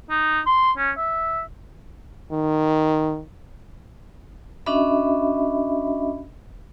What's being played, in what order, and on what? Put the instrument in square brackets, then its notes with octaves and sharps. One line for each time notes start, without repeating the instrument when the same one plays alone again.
[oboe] D#4
C6
C#4
E5
[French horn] D#3
[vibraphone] C#4 D4 F#4 D#5 E5 B5